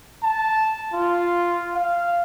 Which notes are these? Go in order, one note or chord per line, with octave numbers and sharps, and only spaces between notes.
A5
F4
F5